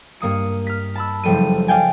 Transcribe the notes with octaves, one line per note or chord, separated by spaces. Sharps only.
G2 A#3 D#6 C#7
F6 B6
A5 B5 E6
F#1 F3 G3 A3 D#7
D5 F5 G5 G#5